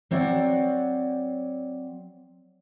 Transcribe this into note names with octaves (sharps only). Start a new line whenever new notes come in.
F#3 C4 C#5 D5 F5 F#5